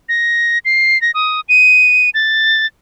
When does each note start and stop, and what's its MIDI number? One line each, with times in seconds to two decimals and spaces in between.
0.09 0.58 94
0.65 1.00 96
1.02 1.11 94
1.14 1.41 87
1.49 2.10 99
2.14 2.66 93